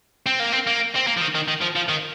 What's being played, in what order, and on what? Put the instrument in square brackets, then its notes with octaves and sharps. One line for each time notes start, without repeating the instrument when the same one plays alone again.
[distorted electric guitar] C4
A#3
C4
A#3
C4
A#3
F3
D#3
D#3
D#3
F3
F3
D#3